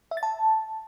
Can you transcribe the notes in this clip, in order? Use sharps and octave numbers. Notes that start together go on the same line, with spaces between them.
E5
A6
A5